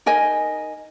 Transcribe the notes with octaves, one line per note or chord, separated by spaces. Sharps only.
D#4 A#4 D#5 G#5